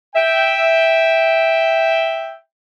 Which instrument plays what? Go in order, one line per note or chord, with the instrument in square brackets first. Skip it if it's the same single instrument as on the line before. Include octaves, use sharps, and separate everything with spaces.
[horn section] E5 G5